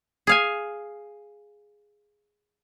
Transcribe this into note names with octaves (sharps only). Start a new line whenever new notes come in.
G#4 F5 G#5